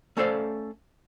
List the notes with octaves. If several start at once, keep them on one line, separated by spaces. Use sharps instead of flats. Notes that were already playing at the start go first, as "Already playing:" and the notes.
A3 C#4 A4 C5 D5 F5